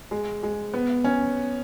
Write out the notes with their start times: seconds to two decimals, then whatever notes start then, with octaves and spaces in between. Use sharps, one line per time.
0.11 G#3
0.43 G#3
0.74 B3
1.04 C#4